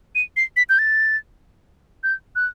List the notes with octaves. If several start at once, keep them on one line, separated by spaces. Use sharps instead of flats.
D#7
C7
B6
G6
A6
G6
F#6